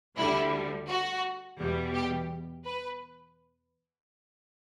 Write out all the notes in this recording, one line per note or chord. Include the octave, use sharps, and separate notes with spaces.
D2 D3 G3 E4
F#4
E2 B2 G3
G4
B4